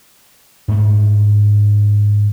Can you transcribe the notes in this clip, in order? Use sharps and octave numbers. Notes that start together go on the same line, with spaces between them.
G#2 A3